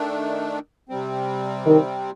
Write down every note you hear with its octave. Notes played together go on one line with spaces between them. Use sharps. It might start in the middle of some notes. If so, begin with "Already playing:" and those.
Already playing: D#3 A3 D4
C3 G3 C4
D#3